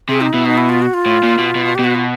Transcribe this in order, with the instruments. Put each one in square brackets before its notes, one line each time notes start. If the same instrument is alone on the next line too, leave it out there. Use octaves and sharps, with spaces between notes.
[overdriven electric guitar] C3 [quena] G#4
[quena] D#4
[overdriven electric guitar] B2 [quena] E4
[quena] D#4
E4
F4
F#4
F4
[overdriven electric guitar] A2
A#2
B2
B2
[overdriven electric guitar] B2 [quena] G4
[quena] F#4
F4